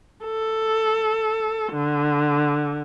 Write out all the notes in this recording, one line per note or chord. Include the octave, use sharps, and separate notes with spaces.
A4
D3